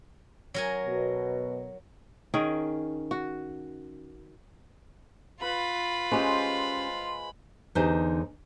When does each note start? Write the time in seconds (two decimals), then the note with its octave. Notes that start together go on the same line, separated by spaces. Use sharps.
0.54 F#3 A#4 G#5
0.87 B2
2.34 D#3 C#4 G#4 A#4
3.11 F#4
5.42 F4 B4 B5
6.12 G#3 C#4 G4 B4 C5
7.75 E2 D3 D#4 G4 C5 G#5